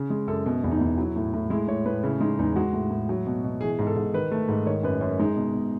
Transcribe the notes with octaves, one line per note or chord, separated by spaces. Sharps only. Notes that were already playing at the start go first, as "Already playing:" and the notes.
Already playing: C#3
G#3
F#2 A4
B2
E2
D#4
E2
F#3 E4
A2
A2
G#3 E4
A2 C#5
A2 B4
C#3 E4
G#3 D#4
E2 D#4
G#3 F#4
A2
A2
F#3
B2
B2
E3 G#4
G#2
A4
G#2
D#3 B4
A3
G#2
D#3 C#5
F#2 B4
F#2 C#4
G#3 D#4
B2
B2